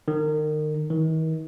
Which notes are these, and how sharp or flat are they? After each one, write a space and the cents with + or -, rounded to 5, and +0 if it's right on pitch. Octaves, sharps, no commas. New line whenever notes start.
D#3 -30
D#3 +45